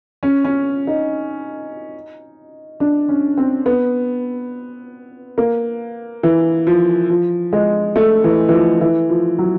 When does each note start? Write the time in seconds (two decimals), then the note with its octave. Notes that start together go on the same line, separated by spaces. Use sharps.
0.23 C#4
0.44 C#4
0.87 D#4
2.80 D4
3.09 C#4
3.37 C4
3.66 B3
5.38 A#3
6.23 E3
6.67 F3
7.10 F3
7.53 G#3
7.96 A3
8.24 E3
8.49 E3
8.53 F3
8.81 E3
9.09 F3
9.39 F#3